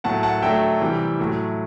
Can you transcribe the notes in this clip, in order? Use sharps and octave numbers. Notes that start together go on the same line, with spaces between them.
A2 F#3 A3 F#5 A5
F#5 A5
D3 F#3 A3 E5 G5
C3 E3 G3
A2 F#3 A3